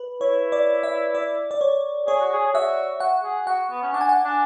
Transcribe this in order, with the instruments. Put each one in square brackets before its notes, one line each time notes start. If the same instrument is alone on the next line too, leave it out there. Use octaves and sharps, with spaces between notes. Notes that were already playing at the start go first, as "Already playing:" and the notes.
Already playing: [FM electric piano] B4
[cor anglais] E4 [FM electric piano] C#5
[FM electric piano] D5
E5
D5
D5
C#5
[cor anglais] G#4 [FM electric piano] C#5
[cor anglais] F#4
G#4
G#4
[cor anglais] F#4 [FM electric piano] E5
[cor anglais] F#4 [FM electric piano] F#5
[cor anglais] G#4
[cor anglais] F#4 [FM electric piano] F#5
[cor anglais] B3
C#4
[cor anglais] D4 [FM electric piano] F#5
[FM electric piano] G#5
F#5
[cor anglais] D4